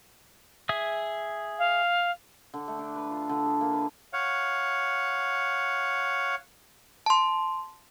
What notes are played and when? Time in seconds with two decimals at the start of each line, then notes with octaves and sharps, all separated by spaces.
0.69 G#4 E5 D#6
1.59 F5
2.54 D3
2.68 A3
2.79 D4
2.96 B4
3.11 F4
3.29 D3
3.45 G#4
3.61 A#3
3.73 B4
4.13 C#5 F5 F#5
7.06 A5 C6